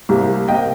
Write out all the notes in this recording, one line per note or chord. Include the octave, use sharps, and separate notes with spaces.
C2 C3 G3 A#3
C3 G3 A#3 D#5 G5